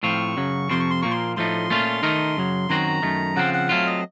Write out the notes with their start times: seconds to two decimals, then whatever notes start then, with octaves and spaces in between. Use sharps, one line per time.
0.03 A2 F3 C4 F4 C#6
0.37 F#2 C#3 F#3
0.69 F2 C3 F3 C4 C6
0.80 C#6
0.91 C6
1.02 A#2 F3 A#3 C#6
1.11 C6
1.36 A2 F3 A3 D#4 C6
1.70 A#2 A3 C#4 F4
2.03 D#3 A3 D#4 A#4
2.37 F#2 C#3 F#3
2.69 F#2 D#3 F#3 C4 F#4 A#5
3.02 F#2 D#3 A3
3.36 C#3 F3 C4 F#5
3.54 F#5
3.69 F#3 A3 C4 F4 F5
3.87 D#5